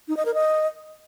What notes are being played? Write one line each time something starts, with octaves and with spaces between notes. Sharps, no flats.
D#4
D#5
A#4
D#5